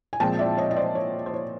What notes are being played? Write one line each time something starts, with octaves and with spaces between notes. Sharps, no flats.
G#5
A#2 F3 G#3 C4 G5 A5
D5 E5
C#5 D#5
D#5
C5 D5
C#5
C5
C#5